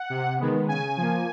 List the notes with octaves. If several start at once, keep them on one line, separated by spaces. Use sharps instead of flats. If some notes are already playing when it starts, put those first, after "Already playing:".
Already playing: F#5
C3
D#3 G#3 B3
C#3 G#5
F3 A#3